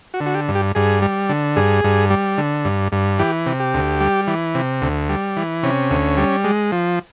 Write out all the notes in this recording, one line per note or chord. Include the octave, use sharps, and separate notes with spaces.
F#4
D3
F#4
G4
G2
G4
G2 G#4
G3
D3
G2 G#4
G2
G3
D3
G2
G2
E3 G4
C3
G4
D2
G3
E3
C3
D2
G3
E3
C3 C#4
D2
G3
G#3
F3